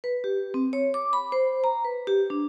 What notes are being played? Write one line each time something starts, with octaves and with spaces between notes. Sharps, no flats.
B4
G4
C4
C#5
D6
B5
C5
A#5
B4
G4
D4